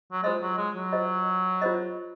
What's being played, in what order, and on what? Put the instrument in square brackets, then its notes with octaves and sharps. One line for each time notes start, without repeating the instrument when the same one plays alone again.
[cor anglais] F#3
[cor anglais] G#3 [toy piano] F4 C5 D#5
[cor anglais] F#3
G#3
F#3
[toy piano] F4 C5 D#5
F4 C5 D#5